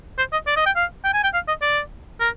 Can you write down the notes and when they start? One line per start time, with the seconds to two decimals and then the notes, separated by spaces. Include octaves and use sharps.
0.18 C5
0.32 D#5
0.47 D5
0.57 D#5
0.66 G5
0.76 F5
1.04 G5
1.14 G#5
1.24 G5
1.34 F5
1.48 D#5
1.62 D5
2.20 A#4